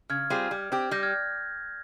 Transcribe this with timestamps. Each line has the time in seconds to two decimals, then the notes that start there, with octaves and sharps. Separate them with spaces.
0.09 C#3 F6 G#6
0.30 G3 C4 F4 G#4
0.51 G3
0.72 C4 G4
0.91 G3 G6 A#6
1.03 F6 G#6